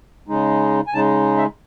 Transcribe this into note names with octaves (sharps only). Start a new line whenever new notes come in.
C#3 G#3 D#4
G#5
C#3 G#3 D#4 A5
E5